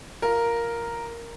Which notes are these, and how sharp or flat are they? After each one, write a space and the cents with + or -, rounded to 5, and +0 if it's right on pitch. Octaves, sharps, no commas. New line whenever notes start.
F4 +0 A#4 +0